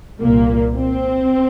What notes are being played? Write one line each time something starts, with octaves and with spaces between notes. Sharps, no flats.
C2 A#2 A#3
C4